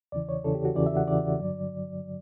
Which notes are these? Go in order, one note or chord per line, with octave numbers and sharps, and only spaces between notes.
E2 C#3 E3 D5
C#5
E2 C#3 E3 A4
G4
F#4
E2 C#3 E3 D5
E5
F#5
E2 C#3 E3 D5
G2 D3 F#3